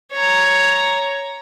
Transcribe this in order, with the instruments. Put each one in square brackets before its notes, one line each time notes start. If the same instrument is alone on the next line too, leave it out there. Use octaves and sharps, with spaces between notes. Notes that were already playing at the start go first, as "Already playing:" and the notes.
[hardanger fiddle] C#5 A#5